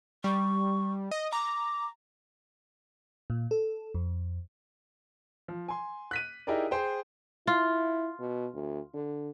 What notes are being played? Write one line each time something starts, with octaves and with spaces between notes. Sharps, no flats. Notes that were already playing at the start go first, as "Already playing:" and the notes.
G3 C#6
D#5
A#5 D6
A#2
A4
F2
F3
G#5 C6
F#6 B6 D#7
D#4 E4 G4 G#4 A#4 D5
G#4 C5 G5
E4 F4
B2
D2
D3